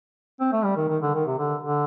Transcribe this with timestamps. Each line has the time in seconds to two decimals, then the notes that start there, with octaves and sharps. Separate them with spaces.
0.40 C4
0.52 A3
0.64 G3
0.76 D#3
0.89 D#3
1.02 D3
1.14 D#3
1.26 C3
1.38 D3
1.63 D3